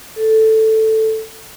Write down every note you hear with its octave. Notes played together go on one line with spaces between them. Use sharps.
A4